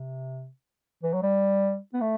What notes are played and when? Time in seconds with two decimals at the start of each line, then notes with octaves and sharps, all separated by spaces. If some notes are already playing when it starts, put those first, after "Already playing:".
Already playing: C3
1.03 E3
1.13 F#3
1.22 G3
1.94 B3
2.00 A3